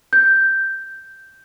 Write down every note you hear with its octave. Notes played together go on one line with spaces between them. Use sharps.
G6